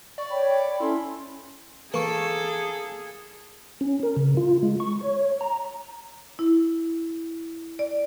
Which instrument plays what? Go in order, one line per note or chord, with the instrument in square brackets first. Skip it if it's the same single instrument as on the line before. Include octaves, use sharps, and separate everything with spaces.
[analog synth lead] D5 [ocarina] C#6
[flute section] C#5 G5 [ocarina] B5
[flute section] C#4 A4 [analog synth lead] E4 [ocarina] C6
[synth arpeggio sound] E3 C#6 [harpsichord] A#3 [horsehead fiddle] G#4 [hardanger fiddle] A4
[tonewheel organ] C#4
A#4
C#3
F4
G#3
C#6
C#5
A#5
[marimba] E4
D5